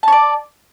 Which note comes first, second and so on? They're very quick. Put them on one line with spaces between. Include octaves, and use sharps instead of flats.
A5 C#5 D5